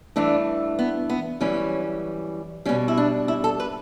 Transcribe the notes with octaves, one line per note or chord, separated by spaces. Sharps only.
G2 E3 A3 D4
B3
B3
F#2 E3 G3 C#4
B2 G3 C#4
E4
D4
E4
A4
B4